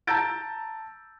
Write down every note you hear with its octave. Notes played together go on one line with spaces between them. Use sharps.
A5 A#5 E6 G6 A6 D7